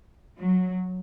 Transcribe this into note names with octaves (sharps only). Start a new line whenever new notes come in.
F#3